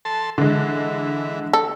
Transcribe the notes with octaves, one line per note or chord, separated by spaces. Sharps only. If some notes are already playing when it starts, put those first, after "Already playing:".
A4 A5 C6
D3 E3 G#3
A4